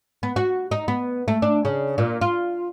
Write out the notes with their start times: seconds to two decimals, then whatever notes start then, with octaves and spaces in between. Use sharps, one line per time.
0.23 B3
0.36 F#4
0.71 D#4
0.88 B3
1.28 A3
1.42 D4
1.65 C#3
1.98 A#2
2.21 F4